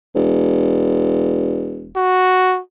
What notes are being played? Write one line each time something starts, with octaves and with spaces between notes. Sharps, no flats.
E1
F#4